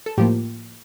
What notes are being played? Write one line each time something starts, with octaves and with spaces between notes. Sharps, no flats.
A4
A2 F3 A#3 G4